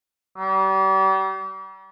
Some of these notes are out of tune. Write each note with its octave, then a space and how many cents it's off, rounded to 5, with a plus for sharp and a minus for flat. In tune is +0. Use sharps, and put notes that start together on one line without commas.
G3 -40